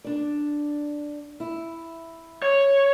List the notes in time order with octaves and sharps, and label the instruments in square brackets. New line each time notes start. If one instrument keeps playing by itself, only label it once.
[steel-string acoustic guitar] D4 D5
E4
[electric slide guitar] C#5